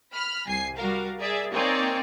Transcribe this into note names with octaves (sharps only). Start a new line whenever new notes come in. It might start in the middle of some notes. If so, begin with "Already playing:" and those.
B5 F6
C2 G#5 C7
G3 F#4 A#4 F5
G#4 A#4 D5 E5
A#3 C4 D#4 C#5 D5 G#5